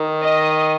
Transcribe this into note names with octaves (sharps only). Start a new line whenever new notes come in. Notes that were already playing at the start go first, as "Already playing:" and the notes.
Already playing: D#3
D#5